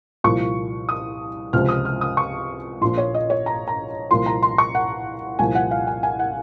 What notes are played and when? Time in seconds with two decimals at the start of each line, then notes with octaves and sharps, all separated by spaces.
0.24 C2 A#2 F3 C#6
0.89 D#6
1.53 C#2 C3 F3 F6
1.69 D#6
1.85 F6
2.01 D#6
2.17 C#6
2.81 A#1 A#2 F3 C6
2.98 C#5
3.14 D#5
3.30 C#5
3.46 A#5
3.68 A#5
4.10 C2 A#2 F3 C6
4.26 A#5
4.43 C6
4.58 C#6
4.75 F#5
5.39 C2 A#2 F3 G#5
5.55 F#5
5.71 F5
5.87 G#5
6.03 G#5
6.19 F#5